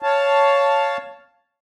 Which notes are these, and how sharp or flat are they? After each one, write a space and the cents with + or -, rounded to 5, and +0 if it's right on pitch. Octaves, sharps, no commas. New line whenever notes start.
C#5 +10 F5 +0 A5 +0